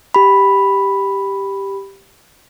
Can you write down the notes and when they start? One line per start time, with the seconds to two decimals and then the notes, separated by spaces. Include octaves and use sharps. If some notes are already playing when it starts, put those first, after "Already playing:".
0.14 G4 B5